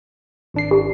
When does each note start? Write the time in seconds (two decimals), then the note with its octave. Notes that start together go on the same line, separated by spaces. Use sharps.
0.54 G#1 D4 C7
0.71 G4